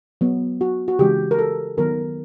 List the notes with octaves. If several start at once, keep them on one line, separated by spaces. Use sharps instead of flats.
F#3 B3
F#4
F#4
C#3 E3 G#3 G4
A#4
A4
D#3 F#3 B3 A#4